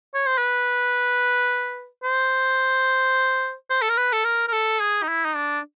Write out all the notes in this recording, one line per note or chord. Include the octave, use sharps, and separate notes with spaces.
C#5
C5
B4
C5
C5
A4
A#4
B4
A4
A#4
A#4
A4
G#4
D#4
E4
D#4
D4